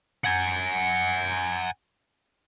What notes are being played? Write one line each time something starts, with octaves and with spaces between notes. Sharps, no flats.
F#5 G#5